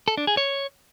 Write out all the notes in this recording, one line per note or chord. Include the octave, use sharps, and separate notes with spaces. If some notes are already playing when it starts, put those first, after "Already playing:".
A4
D4
G#4
C#5